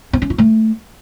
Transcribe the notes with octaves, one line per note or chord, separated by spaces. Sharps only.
C4
C#4
F4
A3